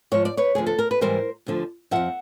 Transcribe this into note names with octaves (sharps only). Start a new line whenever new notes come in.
G#2 F3 C#5
D5
B4 C#5
D2 D3 F3 G#4
A4
A#4
B4
G#2 E3 G3 A#4 C5
D2 D3 F3
F2 C3 F3 E5 F#5